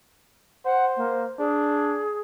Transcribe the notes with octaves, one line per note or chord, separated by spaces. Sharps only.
C5 F#5
A#3
D4 G#4